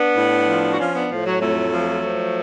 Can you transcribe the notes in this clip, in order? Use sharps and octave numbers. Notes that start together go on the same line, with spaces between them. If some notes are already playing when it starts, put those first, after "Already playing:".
Already playing: B3 D4
A2
F3
F#4
F3 C#4 F4
B3 D4
A2 F3
F#3
F2 F#3 A3
F3
F3